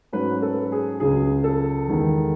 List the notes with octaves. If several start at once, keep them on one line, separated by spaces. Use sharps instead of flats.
G#2 F#3 A3 C#4 B4
A4
G#4
C#2 C#3 F#3 G#4
A4
E2 D#3 G#3 B3